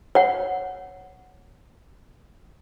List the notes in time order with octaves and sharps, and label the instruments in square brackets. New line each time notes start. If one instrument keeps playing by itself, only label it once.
[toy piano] C#5 F#5